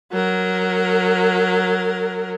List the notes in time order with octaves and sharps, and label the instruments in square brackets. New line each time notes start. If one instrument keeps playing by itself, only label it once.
[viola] F#3 A#4